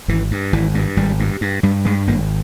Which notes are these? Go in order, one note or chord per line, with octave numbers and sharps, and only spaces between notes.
G#1 E3
G2
G#1 E3
G2
G#1 G3
G2
G2
G2 G3
G2 G#3
G#1 A#3